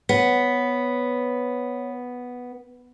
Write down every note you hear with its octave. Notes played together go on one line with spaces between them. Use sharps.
B3 B4 C#5